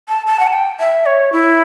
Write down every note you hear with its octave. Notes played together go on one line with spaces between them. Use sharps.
A5
A5
F#5
A5
G5
E5
C#5
E4